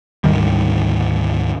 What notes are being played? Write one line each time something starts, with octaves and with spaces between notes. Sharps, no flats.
D2 G#2 D#3 G3